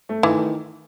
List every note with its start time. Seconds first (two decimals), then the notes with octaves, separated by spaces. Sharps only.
0.09 A3
0.23 D#3 E3